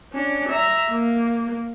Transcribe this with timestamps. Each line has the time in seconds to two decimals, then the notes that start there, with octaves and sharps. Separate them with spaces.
0.13 C#4 D4
0.50 E5 A#5
0.91 A#3